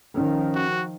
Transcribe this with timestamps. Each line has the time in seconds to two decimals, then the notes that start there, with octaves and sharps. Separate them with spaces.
0.17 D#3 F3 C#4
0.55 F#4